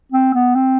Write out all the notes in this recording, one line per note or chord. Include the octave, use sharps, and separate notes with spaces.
C4
B3
C4